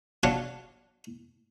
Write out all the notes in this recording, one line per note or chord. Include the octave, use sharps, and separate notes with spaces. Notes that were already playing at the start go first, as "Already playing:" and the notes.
F#3 D4 F4 F5 F#5